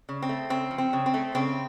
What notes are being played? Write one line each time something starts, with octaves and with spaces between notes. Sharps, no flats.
C#3
C4
A3
C#3 C4
F3
C4
C#3
C4
A3
C#3 C4